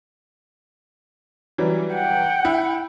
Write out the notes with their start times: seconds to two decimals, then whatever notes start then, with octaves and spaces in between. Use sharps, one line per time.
1.58 E3 F#3 G3
1.93 F#5 G5
2.45 E4